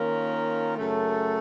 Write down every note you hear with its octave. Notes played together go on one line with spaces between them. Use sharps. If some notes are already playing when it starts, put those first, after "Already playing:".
Already playing: D#3 A#3 C#4 F4 A#4
F#2 C#3 A3